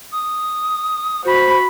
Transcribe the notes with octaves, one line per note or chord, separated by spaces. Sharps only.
D#6
F#4 C5 B5